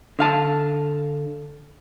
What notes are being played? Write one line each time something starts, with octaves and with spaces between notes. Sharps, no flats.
D3 F5 A5